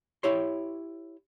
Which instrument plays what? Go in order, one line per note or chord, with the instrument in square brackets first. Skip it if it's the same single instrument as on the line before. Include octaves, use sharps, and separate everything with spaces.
[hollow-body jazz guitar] E4 G4 C#5 C6